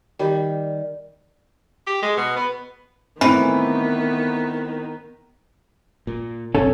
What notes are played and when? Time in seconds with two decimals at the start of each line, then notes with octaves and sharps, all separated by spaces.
0.19 D#3 G3
1.87 G4
2.02 G#3
2.17 B2
2.36 B3
3.21 A2 D#3 E3 B3 C4
6.07 A#2
6.55 B1 F#2 C4 C#4 A4